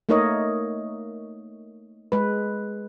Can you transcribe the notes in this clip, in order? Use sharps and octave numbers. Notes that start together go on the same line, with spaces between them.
A3 A#3 D#4 A#4 C#5 D#5
G#3 B4